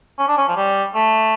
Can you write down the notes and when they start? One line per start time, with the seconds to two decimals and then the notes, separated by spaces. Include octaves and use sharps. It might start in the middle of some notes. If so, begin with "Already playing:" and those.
0.18 C#4
0.28 D4
0.38 C#4
0.48 F3
0.56 G3
0.94 A3